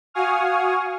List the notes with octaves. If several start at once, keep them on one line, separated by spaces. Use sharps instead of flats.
F#4 F5 G#5 C#6 D#6 F6